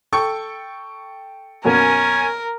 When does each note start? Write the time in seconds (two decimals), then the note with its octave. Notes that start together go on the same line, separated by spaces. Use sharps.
0.13 A4 G5 C#6
1.64 F#2 B2 A#3 C#4 A#4 G#5